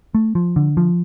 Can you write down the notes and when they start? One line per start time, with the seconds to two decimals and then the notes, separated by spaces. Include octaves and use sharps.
0.14 A3
0.35 F3
0.56 D3
0.77 F3